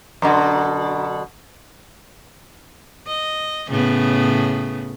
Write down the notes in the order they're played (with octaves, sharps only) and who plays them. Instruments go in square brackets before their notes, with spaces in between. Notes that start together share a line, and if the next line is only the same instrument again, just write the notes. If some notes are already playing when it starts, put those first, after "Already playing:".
[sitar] F#2 B2 D3
[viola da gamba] D#5
A2 C#3 B3